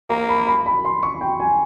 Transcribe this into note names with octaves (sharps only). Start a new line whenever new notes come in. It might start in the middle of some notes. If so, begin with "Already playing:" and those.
A#3 A#5
B5
B5
B5
C6
C#6
G5
G#5